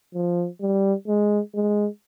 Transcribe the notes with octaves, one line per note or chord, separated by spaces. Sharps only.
F3
G3
G#3
G#3